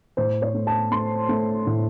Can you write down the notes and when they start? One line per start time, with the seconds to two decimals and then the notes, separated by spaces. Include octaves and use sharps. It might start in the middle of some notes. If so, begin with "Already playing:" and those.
0.17 A2 C5
0.42 C#5
0.54 A3
0.67 A5
0.91 A3 C6
1.29 A3
1.67 A2